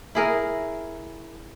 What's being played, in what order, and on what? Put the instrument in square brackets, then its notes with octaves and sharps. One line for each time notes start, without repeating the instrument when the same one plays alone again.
[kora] E4 G#4 A#4